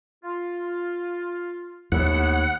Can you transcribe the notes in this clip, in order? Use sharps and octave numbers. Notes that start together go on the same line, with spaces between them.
F4
D#2 A3 B3 E4 F#5